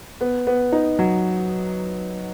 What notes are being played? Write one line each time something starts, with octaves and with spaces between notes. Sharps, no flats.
B3
B3
D#4
F#3